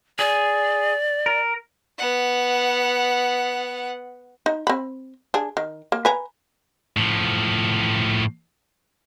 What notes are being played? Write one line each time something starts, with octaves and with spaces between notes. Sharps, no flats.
G#4 D5
A#4
B3 F#5
D#4
C4 B5
D4 G#4
D#3
A#3
B4 G#5 A#5
A2 F3